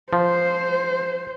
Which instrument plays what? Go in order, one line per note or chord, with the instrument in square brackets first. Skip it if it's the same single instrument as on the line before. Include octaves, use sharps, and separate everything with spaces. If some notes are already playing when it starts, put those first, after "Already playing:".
[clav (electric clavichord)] F3 [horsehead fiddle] C5